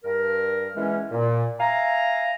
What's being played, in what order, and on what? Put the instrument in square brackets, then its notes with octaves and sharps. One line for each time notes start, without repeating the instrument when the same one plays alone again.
[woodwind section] G2 A#4
E2 E3 G#3 C#4
A#2
E5 F5 G#5 A#5